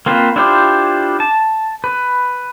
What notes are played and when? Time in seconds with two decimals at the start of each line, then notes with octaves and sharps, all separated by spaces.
0.06 A#3 C4 F4 B4 C5
0.36 D4 E4 F4 G4 C5
1.20 A5
1.84 B4